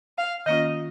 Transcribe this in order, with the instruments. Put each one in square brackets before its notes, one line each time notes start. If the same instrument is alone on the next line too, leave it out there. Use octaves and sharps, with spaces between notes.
[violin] F5
[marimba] D#3 A#3 C#4 F4 [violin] D#5